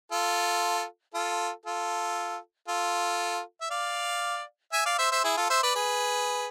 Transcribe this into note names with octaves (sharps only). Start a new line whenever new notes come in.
F4 A4
F4 A4
F4 A4
F4 A4
E5
D5 F5
E5 G#5
D5 F5
C5 E5
C5 E5
E4 G#4
F4 A4
C5 E5
B4 D5
G#4 B4